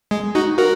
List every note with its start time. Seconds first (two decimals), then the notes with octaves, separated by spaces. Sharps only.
0.11 G#3
0.35 D#4 F#4
0.58 F#4 A#4